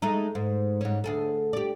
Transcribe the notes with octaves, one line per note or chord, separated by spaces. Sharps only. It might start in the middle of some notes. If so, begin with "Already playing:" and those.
G#3 A3 D#4
G#2
G#2 C#4
D2 G#4 A4
G4 D5